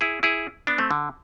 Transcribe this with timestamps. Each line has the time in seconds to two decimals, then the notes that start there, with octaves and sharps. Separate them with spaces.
0.01 E4 G#4
0.23 E4 G#4
0.67 B3 D4
0.78 A3 C4
0.91 D3